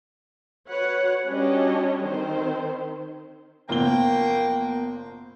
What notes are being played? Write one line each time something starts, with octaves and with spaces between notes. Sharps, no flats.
F#4 B4 C#5 F#5
G3 C#4 D4 F#4 C#5 D#5
D#3 C4 C5
F#1 F3 A#3 B3 A#4 G5 G7